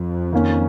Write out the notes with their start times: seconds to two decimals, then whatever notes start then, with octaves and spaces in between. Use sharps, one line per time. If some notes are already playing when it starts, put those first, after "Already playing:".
Already playing: F2 F3
0.32 D#3 A#3 C#4